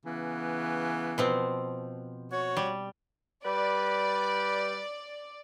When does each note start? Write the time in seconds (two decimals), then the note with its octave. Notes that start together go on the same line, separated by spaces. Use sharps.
0.05 C#3 E3 B3
1.18 B2 F3 C4
2.31 F#4 C#5
2.57 G3
3.44 G3 B4 D5